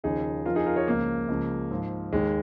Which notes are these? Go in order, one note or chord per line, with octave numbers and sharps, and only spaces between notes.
D#2 C#3 F3 D#4 G#4
F2 F3 F4 A#4
D#4 G#4
F4 A#4
G#4 C#5
C#2 C#3 F3 A#3
C#2 C#3 F3
G#2 F3
D#2 D#3 G#3